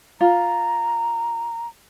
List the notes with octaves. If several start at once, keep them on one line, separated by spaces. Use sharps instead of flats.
F4 A#5